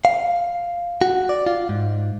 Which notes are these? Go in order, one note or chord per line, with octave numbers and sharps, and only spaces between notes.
F5
F#4
D5
F4
G#2